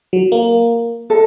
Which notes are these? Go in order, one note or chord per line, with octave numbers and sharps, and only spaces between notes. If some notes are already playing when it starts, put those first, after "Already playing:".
F#3
A#3
A4 D#5